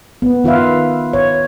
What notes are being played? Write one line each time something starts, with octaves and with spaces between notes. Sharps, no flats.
B3
D#3 F4 B4 E5 F5
C#5